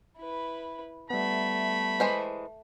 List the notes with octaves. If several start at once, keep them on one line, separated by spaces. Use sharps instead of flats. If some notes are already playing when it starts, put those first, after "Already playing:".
E4 B4
G3 A3 B3 E5 B5
E3 G#3 C5